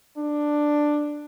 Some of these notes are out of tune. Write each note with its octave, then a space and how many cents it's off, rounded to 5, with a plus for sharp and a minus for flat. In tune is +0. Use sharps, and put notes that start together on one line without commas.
D4 +10